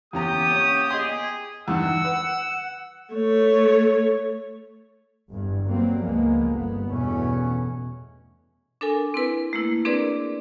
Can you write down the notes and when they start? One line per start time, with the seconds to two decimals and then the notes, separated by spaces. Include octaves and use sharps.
0.13 E2 A#3 B3 C#4 G4 A#5 D#6
0.51 C#4 C#5
0.90 G#4 D#5 C6
1.68 E2 G2 D#3 F#5 E6
2.04 B4
3.14 A3 C#5
5.29 G1 E2 G2
5.66 F#3 G3 A#3 C4
6.04 C#2 F3 G#3 A#3 B3
6.49 G1 G2 B3
6.88 E2 G2 B2 E3 A3 C#4
8.81 D4 A4 A#4 G#5
9.14 C4 E4 B4
9.53 A3 A#3 E4
9.85 C4 D4 G#4 A#4 B4 D5